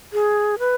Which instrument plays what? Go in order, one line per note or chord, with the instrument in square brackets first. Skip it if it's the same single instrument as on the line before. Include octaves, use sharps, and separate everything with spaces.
[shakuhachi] G#4
B4